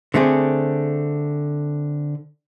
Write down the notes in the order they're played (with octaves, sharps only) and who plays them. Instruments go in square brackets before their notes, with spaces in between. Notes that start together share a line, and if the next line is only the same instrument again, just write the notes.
[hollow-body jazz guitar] D3 A3 C4 G#4